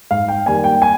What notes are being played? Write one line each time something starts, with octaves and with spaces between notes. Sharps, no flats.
G#2 F5
G5
D#3 G3 A#3 G#5
G5
G#5